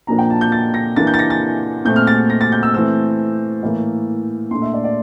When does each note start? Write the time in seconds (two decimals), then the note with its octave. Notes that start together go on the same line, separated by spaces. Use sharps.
0.07 A#2 F3 A#3 D4 A#5
0.18 G5
0.30 A5
0.41 G6
0.52 A6
0.74 A#6
0.96 E3 A#3 D4 A6
1.07 G6
1.14 A6
1.19 A#6
1.30 A6
1.85 A#2 A3 C4 G6
1.96 F6
2.07 A6
2.30 A#6
2.41 A6
2.52 G6
2.63 E6
2.74 E3 A3 C4 E6
3.63 A2 E3 A#3
4.51 A#2 A3 D4 C6
4.62 E5
4.73 D5
4.84 D5